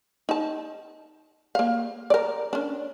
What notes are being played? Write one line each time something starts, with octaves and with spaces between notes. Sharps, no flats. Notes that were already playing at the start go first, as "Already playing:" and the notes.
D#4 A5
A#3 F5
A#4 D5
C#4 D4